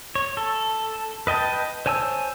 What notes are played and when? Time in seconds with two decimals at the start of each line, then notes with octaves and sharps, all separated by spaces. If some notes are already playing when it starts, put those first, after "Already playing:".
0.15 C#5
0.37 A4
1.27 B4 D#5 G5 A5
1.86 C5 C#5 G#5 A5 E6